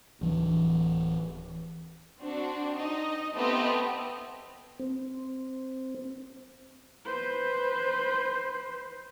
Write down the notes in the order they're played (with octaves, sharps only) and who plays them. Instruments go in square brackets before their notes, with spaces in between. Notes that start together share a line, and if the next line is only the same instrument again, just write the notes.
[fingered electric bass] D1 E3 D4
[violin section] C4 D4 F#4
D#4 D#5
A3 B3 C4 G4 D#5
[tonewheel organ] C4
[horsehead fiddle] B4 C5